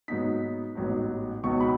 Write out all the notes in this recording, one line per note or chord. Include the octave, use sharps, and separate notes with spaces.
G#2 F#3 B3 D#4 B6
A1 G#2 F#3 B3 D#4
C#2 B2 F#3 B3 D#4 C#6
B5